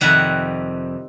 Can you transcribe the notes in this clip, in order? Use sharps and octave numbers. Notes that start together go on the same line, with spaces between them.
F2 C3 D#3 G3 E5 F#5